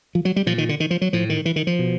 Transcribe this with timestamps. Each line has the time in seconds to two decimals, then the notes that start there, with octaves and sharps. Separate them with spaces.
0.15 F3
0.25 F#3
0.36 G3
0.46 A#2 F3
0.58 D#3
0.69 D3
0.80 D#3
0.91 F3
1.01 F#3
1.13 A2 F3
1.30 D#3
1.45 E3
1.56 D#3
1.67 F3
1.79 B2